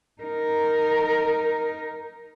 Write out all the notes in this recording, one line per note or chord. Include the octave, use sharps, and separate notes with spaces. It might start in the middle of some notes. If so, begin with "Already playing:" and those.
D#4 A#4